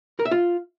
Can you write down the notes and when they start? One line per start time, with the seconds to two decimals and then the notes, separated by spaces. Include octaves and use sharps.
0.19 A#4
0.25 E5
0.31 F4